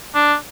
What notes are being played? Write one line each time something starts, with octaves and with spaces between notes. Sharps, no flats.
D4